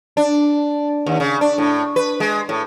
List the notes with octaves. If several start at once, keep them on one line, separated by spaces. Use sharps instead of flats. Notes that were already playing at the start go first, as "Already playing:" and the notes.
D4
D#2
C#3
D4
A2
B4
G#3
A2